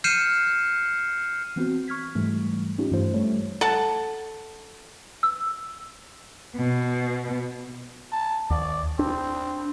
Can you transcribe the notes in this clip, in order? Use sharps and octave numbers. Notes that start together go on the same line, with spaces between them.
F6 G6 C7 C#7 D#7 E7
E3 B3 C4 F#4
C#6 F6 G#6 B6
G#2 E3 G3 A3
C#4 D#4 F4 G4
G2 E3 A3 F4 C5
G3 A3 C#5
A4 F#5 A5
E6
B2
A5
D#2 D5
C4 D4